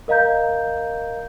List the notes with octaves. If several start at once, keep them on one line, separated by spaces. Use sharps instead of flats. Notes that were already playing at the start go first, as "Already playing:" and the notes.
A#4 D#5 F5 A#5 G6